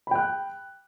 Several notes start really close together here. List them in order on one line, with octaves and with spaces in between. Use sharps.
B5 G5 F#6